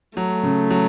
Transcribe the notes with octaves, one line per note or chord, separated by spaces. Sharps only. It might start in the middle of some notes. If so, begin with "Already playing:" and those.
F#3 A3
C#3
F#3